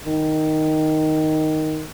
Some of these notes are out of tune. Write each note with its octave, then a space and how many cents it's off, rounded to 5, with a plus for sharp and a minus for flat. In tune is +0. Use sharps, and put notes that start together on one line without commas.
D#3 +0